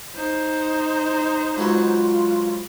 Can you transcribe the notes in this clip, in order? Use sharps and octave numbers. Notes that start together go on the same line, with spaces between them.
D#4 C5
G#2 F#3 B3 F4